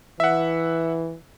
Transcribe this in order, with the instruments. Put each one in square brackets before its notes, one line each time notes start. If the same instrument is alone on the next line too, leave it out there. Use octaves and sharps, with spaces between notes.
[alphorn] E3 [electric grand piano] E5 F#5